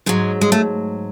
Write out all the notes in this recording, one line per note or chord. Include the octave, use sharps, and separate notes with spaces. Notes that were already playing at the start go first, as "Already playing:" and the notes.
G#2 F#3 G#3
G#3
A3